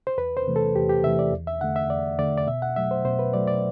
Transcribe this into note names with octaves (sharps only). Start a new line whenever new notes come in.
C5
E2 B4
C5
C3 E3 A3
A4
E2 G4
G4
C3 E3 A3 E5
D5
E2
E5
D3 A3 F#5
E5
E2 D5
D3 A3 D5
D5
B2 E5
F#5
F#3 A3 E5
C5
B2 C5
B4
F#3 A3 D5
D5